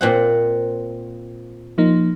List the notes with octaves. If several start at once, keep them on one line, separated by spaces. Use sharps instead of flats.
A#2 C4 F#5
F3 A#3 D#4